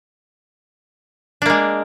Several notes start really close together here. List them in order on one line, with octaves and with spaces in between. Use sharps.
D4 A#3 G#3